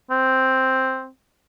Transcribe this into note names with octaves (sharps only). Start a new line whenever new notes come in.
C4